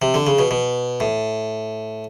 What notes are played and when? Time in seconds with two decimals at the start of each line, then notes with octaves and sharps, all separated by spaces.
0.02 C3
0.14 D3
0.27 C#3
0.39 B2
0.51 B2
1.00 A2